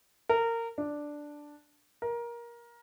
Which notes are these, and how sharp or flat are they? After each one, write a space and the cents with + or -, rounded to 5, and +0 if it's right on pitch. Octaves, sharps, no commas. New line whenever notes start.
A#4 -20
D4 +0
A#4 +20